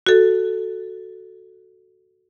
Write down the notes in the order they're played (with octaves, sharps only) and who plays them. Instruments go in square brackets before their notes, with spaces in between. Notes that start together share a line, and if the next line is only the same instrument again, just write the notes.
[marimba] F#4 A4